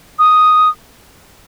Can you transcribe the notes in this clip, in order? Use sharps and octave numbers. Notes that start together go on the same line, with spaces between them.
D#6